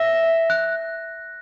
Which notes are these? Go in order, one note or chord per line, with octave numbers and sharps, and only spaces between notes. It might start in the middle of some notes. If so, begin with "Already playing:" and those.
Already playing: E5 A#6
F#6